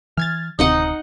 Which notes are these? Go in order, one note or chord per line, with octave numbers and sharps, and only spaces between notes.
E3 F6 G#6 A6
D1 C3 D#3 C4 D#4 D#5 F#5 D#6